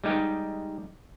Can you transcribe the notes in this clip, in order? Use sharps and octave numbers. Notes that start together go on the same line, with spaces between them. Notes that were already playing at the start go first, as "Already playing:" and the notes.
G3 G#3 D#4 G4